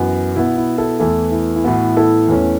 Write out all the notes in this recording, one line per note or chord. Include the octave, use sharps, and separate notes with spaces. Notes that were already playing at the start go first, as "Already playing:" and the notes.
Already playing: F#2 E3 B3 F#4 B4
B2 B3 E4
E4
E4 A4
E2 E3 A3 E4 A4
E4
E4
A2 E3 B3 F#4
E4 A4
E2 E3 A3 C#4